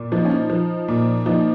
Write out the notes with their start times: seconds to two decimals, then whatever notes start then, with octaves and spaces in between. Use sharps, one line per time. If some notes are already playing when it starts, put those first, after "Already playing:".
Already playing: A#2
0.12 F3 D#4
0.25 C#4
0.30 D#4
0.50 F3
0.88 A#2
1.26 F3 D#4